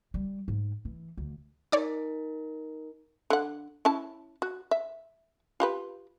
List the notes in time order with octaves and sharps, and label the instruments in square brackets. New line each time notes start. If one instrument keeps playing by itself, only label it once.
[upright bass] G3
G#2
E3
D2
[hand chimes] D#4 A#4 [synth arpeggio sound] C#5 D5 D6
[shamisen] D3 F#5
C#4 E4 A5
F#4
E5
F4 G4 B4